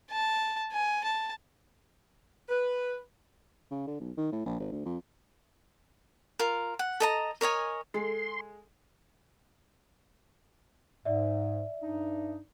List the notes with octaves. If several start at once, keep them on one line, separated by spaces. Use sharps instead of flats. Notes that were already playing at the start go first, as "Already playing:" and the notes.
A5
G#5
A5
B4
C#3
D3
B1
D#3
A2
A#1
G#1
D2
F2
F4 A#4
F#5
A4 D#5 A#5
A#4 C#5 D#5 G#5
G#3 A4 F5 C6
G#2 D5 E5
G2 D4 D#4